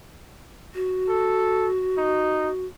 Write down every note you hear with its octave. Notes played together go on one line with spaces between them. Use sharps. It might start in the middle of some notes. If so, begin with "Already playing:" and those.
F#4
A4
D#4